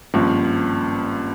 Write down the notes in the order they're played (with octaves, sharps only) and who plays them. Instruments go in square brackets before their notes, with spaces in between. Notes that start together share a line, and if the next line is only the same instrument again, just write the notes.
[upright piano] G#1 G2 F3 [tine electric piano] A#3 C#4